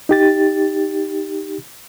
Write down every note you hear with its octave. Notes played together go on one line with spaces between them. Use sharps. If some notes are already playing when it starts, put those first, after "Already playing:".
D#4 G4 A6